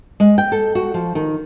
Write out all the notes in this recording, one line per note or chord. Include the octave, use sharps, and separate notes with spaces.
G#3
G5
A4
F#4
F3
D#3